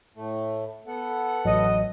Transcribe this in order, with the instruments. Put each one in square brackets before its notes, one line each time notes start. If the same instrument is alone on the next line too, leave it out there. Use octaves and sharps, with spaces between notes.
[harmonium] A2 A3
B3 A4 F#5
[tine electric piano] A1 F#3 [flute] D#5